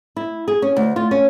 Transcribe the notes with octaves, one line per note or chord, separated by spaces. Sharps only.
E4
G#4
C#4
D2
F4
C#4